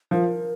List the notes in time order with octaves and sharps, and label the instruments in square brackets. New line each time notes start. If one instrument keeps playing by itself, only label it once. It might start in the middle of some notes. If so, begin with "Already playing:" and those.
[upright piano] F3 [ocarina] A#4